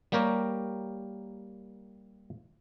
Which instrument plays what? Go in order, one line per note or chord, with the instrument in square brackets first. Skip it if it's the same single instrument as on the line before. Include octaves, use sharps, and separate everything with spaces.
[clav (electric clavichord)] G3 A#3 G4 A#4 C#5